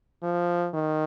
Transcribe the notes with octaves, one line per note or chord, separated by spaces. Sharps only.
F3
D#3